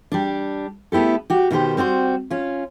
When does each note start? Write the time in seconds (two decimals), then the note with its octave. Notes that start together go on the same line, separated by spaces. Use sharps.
0.12 G3 D4
0.92 A3 B3 E4 G4 A4
1.30 F#4 G4
1.51 B2 D#3 B3 F#4 G4 C5
1.77 G3 C4 F#4 C5
2.30 C#4 F4